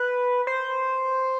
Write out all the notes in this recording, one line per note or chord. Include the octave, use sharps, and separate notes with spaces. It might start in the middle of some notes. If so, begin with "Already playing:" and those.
Already playing: B4
C5